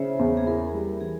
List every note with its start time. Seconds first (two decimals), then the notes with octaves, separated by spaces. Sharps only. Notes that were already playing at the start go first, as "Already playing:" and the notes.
Already playing: C#3 E4 C5 C#5 E5
0.19 E2
0.37 G#4
0.47 E4 A#4
0.74 G3
1.01 E3 G#4